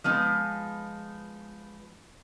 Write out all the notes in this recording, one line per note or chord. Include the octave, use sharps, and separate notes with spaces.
F3 G#3 B3 D#4